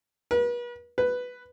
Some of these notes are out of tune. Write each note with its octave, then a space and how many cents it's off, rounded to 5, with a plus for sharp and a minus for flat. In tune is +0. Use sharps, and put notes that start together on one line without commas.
B4 -40
B4 +5